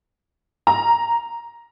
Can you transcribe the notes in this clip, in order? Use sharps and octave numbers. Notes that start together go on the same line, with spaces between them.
A#5